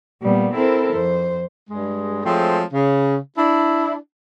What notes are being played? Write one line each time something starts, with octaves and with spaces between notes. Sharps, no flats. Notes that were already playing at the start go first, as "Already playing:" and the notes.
A#2 G3 B3
C4 E4 A4 A#4 C5
F2 C5
G2 G#3
F3 F#3 G#3 A3 C4
C#3
D4 E4